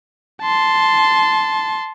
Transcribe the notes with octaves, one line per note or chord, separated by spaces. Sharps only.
A5 C6